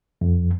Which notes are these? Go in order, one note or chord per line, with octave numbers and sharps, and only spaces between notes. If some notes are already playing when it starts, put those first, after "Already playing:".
F2